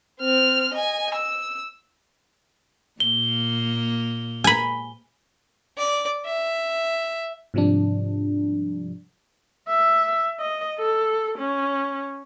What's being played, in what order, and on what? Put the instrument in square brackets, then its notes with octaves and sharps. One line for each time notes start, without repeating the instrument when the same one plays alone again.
[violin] C4 F6
D#5 G#5
E6
[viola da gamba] A#2 A#3 [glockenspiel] G7
[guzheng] G#5 B5
[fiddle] D5
E5
[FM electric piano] G#2 C3 F3 G3 D4
[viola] E5
D#5
A4
C#4